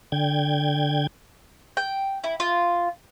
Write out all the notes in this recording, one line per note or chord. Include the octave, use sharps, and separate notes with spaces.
D3 G5 G#6
G5
E4
F4